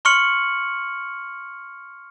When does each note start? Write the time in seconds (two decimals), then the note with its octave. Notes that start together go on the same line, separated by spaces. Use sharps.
0.05 C6 C#6 F6 C#7 F#7